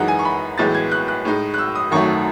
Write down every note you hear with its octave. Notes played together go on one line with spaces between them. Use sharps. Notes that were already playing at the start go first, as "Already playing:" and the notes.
Already playing: F#2 E3 G#3 D#4 F#5
G#5
C#6
B5
B1 A2 E3 G#3 A6
G#6
F#6
F#6
A2 G#3 D#4
F#6
E6
D#6
G#1 F#2 D#3 F#3 A3 C#6